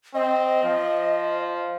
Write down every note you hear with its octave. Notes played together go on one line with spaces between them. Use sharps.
C4 D#5
F3